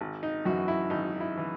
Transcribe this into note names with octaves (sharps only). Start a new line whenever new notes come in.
G#1
D#4
F#2 E3 F#4
E4
G#1 D#4
E4
E3